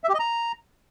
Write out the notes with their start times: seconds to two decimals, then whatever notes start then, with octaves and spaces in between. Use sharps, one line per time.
0.04 E5
0.09 G4
0.14 D#5
0.20 A#5